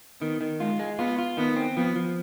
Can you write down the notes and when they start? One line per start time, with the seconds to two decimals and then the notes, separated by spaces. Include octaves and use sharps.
0.21 D#3 B3
0.41 D#3
0.60 G#3 F4
0.79 G#3
0.99 B3 F4
1.19 F4
1.37 D#3 B3
1.56 C4
1.77 F3 B3
1.96 F3